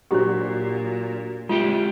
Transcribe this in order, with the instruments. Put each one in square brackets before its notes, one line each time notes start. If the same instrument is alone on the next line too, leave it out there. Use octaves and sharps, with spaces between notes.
[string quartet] A#2 [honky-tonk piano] F#3 D4 F#4 [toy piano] G4 C5
[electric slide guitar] G#3 E4 G4 [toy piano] F4